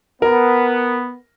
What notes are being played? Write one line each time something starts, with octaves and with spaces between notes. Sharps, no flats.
B3 A#4